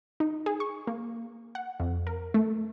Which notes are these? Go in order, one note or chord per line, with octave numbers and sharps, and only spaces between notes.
D#4
G#4
C#6
A#3
F#5
F2
A#4
A3